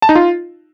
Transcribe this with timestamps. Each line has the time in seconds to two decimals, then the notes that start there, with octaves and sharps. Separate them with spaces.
0.02 A5
0.09 D#4
0.15 F4